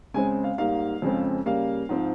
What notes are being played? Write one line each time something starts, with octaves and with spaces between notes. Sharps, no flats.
C#3 G#3 C4 G#5
F5
G#2 G3 A#3 F5
F2 C#3 G#3 C4
C#3 G3 A#3 F5
G#2 F3 C4